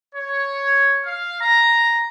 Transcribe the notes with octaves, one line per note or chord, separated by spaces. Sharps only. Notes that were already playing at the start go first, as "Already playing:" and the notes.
C#5
F5
A#5